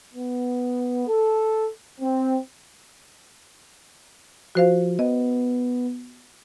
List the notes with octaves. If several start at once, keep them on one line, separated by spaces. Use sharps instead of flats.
B3
A4
C4
F3 F#4 C5 F5
B3 D#5